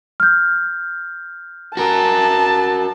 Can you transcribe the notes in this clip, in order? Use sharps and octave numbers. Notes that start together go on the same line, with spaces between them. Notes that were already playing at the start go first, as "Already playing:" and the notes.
F6 G6
F#4 A#4 A5